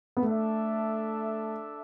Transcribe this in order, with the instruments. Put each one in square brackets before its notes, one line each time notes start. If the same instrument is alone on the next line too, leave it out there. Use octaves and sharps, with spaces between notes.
[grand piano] B3
[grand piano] A3 [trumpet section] D4 A4 E5